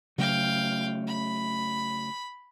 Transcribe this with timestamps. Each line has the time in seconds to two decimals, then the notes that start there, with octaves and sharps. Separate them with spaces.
0.18 C#3 F#3 A3 F5 G5
1.07 B5